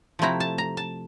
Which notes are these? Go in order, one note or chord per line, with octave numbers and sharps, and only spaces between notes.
C3 F3 A3 C4 E4 A#5
A5
A#5
A5